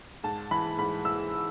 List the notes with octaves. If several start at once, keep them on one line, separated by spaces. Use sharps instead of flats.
G#2 A5
E3 B5
G#2 B5
E3 E6